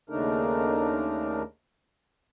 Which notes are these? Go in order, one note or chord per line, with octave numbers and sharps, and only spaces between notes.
D#2 C#3 A3 D4 D#4 A#4